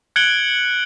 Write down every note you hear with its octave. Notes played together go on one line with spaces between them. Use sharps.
F#6 G#6 C#7 D7 F#7 G7